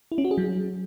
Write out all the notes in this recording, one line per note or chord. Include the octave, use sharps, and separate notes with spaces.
E4
C#4
F#4
G#4
F#3